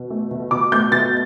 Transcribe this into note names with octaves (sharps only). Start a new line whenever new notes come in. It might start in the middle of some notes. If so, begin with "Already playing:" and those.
Already playing: B2
A3
B2
B2 D6
A3 G6
B2 A6